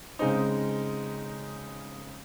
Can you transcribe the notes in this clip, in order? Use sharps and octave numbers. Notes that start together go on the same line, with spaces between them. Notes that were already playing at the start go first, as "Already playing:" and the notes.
C#3 G#3 C4 D#4